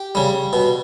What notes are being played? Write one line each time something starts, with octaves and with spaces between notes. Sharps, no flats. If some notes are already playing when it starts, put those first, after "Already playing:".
Already playing: G4
C#3 G3
B2